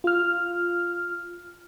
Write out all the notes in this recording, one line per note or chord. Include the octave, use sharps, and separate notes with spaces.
F4 F6